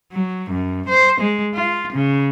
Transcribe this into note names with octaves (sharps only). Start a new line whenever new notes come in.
F#3
F#2
C5
G#3
F4
C#3